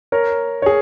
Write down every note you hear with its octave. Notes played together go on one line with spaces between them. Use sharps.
A#4 C#5
C#5
G#4